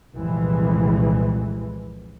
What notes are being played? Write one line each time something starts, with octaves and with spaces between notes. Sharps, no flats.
C2 F2 A#2 E3 G#3